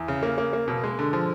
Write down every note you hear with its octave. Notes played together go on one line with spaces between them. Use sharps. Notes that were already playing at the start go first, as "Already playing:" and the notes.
Already playing: E2
C#3
A#3
A#3
A#3
B2
G#3
D3
F3